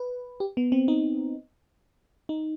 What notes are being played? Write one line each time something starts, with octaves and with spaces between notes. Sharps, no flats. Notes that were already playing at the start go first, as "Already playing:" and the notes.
Already playing: B4
G4
B3
C4
D#4
D#4